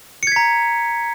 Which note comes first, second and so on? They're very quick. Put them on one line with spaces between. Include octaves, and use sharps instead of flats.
C#7 G#6 B6 A#5